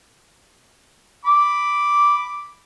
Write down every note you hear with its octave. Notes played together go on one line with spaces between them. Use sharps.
B5 D6